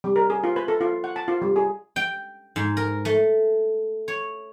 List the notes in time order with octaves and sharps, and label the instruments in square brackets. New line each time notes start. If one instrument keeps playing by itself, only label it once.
[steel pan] G3
A#4
G#4
F4
B4
A4
F4
F#5
A5
F4
G3
G#4
[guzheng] G5
G#2
A#4
A3
C#5